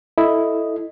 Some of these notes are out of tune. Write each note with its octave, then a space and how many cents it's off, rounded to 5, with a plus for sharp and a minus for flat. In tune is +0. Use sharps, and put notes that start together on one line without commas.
E4 +0 A4 +0 D#5 +0